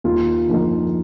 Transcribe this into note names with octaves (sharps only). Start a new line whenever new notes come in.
D#2 F4
D3 F3 A#3 D#4